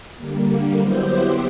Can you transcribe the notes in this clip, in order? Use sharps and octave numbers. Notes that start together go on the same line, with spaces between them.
D3 G3 A#3
F#3 B3 E4 G4 C5